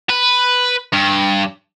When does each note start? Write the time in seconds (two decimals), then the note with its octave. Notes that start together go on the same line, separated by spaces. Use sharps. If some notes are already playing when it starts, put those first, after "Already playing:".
0.10 B4
0.93 G2